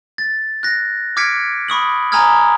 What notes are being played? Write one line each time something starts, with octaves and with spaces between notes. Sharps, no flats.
A6
F#6 A#6
D6 F6 G#6 B6 C#7 D7
B5 C#6 D#6 F#7
G#5 A#5 B5 D#6 F6 G#6